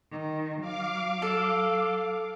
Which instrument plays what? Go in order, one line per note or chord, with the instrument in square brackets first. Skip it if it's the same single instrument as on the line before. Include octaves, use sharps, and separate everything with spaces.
[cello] D#3
[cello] F#3 [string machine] F5 D6
[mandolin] A4